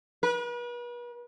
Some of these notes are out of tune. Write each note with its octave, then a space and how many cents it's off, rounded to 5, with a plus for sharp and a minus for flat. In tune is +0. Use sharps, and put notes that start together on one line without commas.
B4 -40